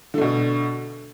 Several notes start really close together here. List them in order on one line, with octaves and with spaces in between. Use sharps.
D3 A3 B2